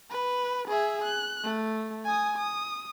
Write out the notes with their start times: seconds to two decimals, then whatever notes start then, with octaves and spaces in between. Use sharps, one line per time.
0.11 B4
0.68 G#4 E5
1.04 F#6
1.44 A3
2.05 G#5 D#6
2.37 D#6